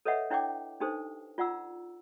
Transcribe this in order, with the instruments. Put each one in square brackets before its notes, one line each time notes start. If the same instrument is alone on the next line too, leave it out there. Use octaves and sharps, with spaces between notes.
[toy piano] A4 B4 C#5 D#5 E5 F#5
D4 E4 C#5 F#5 G5 D6
D4 D#4 G4 A4 B4 C5
F4 D5 F#5 A#5 E6